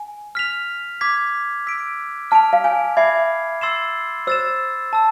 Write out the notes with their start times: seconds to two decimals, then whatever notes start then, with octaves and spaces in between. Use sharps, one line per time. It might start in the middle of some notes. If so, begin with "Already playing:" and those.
Already playing: G#5
0.35 F6 B6 F7
1.01 D6 G#6 B6
1.67 E6 B6 D7
2.31 A5 F6 B6 D7 F7
2.53 F5
2.64 G#5
2.97 E5 B5 D6 G#6 C7
3.61 C6 E6 A6 C7 E7
4.27 C5 E6 A6 E7
4.93 A5 E6